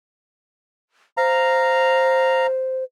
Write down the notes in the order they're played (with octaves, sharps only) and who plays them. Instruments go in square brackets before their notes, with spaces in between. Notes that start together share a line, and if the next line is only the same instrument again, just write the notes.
[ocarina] C5 [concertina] F5 A#5